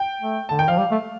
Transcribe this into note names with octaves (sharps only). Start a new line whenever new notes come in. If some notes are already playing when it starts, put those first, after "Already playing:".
Already playing: G5
A3
D3 A5
D#3 G5
F3 F5
G3
A3